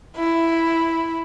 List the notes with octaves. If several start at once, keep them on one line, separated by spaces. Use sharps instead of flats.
E4